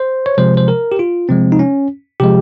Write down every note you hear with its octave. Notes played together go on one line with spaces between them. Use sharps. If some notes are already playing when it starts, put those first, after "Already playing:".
Already playing: C5
C#5
C3 F3 G#3 C5
C5
A#4
G4
F4
C3 F3 G#3 C4
D#4
C#4
C3 F3 G#3 G4